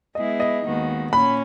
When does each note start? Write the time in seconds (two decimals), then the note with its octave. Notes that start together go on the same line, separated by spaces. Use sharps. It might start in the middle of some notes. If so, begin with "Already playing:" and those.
0.15 G#3 B3 E4 G#4 D#5
0.40 D#5
0.64 D#2 D#3 G#3 B3 F#4
1.12 A#2 A#3 C#4 B5